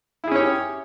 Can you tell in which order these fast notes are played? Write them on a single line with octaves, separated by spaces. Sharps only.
E4 G#4 C#4 C#5 G4